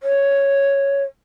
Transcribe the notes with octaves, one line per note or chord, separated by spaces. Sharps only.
C#5